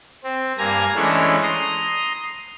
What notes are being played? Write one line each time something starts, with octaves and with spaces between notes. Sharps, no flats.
C4
G2 A#3 G#5 A#5 A#6
E3 G#3 A3 C#4 D4
A#5 C6 D#6